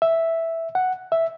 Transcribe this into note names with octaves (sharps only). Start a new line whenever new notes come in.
E5
F#5
E5